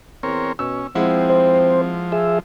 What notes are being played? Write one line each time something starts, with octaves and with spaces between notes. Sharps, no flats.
E2 C4 A#4 C#5
B2 C#4 E6
F3 G#3 C4 E4 F#5
C5
G#4 E5